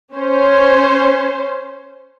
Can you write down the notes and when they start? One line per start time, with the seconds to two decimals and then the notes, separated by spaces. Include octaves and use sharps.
0.13 C#4 C5